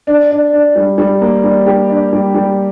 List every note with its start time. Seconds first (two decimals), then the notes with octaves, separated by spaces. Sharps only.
0.07 D4
0.31 D4
0.53 D4
0.76 G3
0.98 G3
1.21 A#3
1.44 G3
1.66 G4
1.90 D4
2.13 G3
2.34 G3